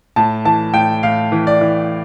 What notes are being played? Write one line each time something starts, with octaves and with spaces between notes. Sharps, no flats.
A2 A5
E3 A5
A2 G5
A2 F5
E3
D5
E3